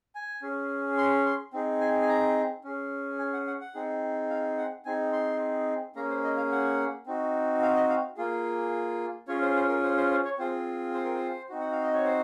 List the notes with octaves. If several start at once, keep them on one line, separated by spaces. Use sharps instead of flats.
G#5
C#4 G#4
C6
C6
C4 D#4 G#4
G#5
G#5
A#5
C#4 G#4
G#5
F#5
F#5
F#5
C4 D#4 G#4
F5
F#5
C4 D#4 G#4 G#5
C6
A#3 C#4 G#4 A#5
C5
D#5
F5
F#5
C4 D#4 F#4
F5
D#5
F5
A#3 F4 G#4
C#4 F4 G#4 C#5
C5
C5
A#4
C5
C5
C5
C#5
C4 F4 G#4 C5
C5
A#4
C5
C4 D#4 F#4
F#5
F5
D#5
C#5
C5